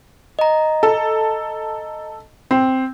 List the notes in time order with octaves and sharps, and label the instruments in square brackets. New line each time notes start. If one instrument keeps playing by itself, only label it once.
[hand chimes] D#5 A#5
[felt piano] A4
C4